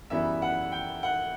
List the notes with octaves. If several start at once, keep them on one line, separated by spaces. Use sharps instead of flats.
F#2 E3 G3 B3 E5
F#5
G5
F#5